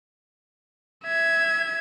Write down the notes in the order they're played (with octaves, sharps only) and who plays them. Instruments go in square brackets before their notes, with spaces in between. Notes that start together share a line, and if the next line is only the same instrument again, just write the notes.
[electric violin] E5 G#6